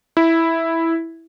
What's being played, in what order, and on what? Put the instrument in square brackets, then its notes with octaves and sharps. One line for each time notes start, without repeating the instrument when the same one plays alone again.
[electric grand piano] E4